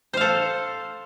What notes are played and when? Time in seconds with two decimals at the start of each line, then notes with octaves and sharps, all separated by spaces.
0.13 C5
0.17 F5
0.21 A4